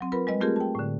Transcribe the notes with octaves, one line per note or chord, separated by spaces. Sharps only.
F#3 C4
F4 A#4 B4 B5
G3 G#3 B4 D#5
A3 C4 F4 G4 G#4 A#4
G5 A5
A2 D3